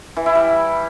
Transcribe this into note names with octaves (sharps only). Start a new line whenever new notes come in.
E3
E4
G3